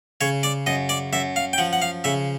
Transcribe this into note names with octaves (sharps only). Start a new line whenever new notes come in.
C#3 C#5
D5
F#2 D#5
D5
F#2 E5
F5
G5
F3 F#5
F#5
F5
C#3 E5